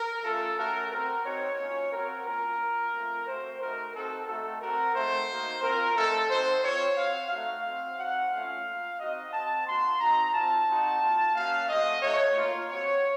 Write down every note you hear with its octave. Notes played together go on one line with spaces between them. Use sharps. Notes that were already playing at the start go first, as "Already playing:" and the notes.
Already playing: A#4
A3 C#4 F4 A4
A3 C#4 F#4 A#4
C4 F#4 A#4
C4 D#4 F#4 C#5
A#3 C#4 F4
C4 F#4 A#4
A#3 C#4 F4 A#4
A#3 F4
A3 C4 F4
A3 C4 F#4 C5
A3 D#4 F#4 A#4
C4 D#4 F#4 A4
A3 C4 D#4 F#4 A4
C4 F#4 A#4
A3 C4 D#4 F#4 C5
A#3 D#4 F#4
C4 F4 A#4
A3 C4 D#4 A4
C4 D#4 F#4 C5
C4 F4 C#5
C4 F#4 F5
A3 D#4 F#4 F5
C4 F#4
C4 D#4 F#4 F#5
A3 C#4 F4 F5
A#3 F4
C4 D#4 F#4 D#5
C4 F#4 A5
A#3 D#4 F#4 C6
C4 D#4 F#4 A#5
C4 F4 A5
C4 D#4 F#4
A#3 F4
A#3 C#4 F#4 F5
A3 C4 F#4 D#5
A3 D#4 F#4 C#5
A#3 F4
C4 F#4 C#5